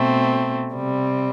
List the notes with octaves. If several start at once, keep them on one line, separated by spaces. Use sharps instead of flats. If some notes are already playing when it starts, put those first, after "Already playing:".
Already playing: B2 A3 C4
C3 G3 C4